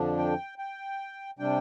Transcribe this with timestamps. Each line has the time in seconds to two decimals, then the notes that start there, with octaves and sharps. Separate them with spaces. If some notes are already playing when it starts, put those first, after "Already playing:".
Already playing: F2 D3 F3 D4
0.18 G5
0.58 G5
1.39 C3 G3 D4 G5